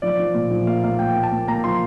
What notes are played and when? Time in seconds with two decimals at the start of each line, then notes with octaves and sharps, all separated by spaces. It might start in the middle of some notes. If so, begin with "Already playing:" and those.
0.02 F3 D5
0.19 F3
0.34 A#2
0.50 F3
0.67 A#3 F5
0.84 A#3 F5
0.99 A#3 G5
1.16 A#3
1.23 A5
1.32 A#3
1.48 A#3 A#5
1.64 F3 C6